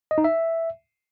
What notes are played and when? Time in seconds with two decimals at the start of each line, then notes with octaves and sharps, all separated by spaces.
0.11 D#5
0.18 D#4
0.24 E5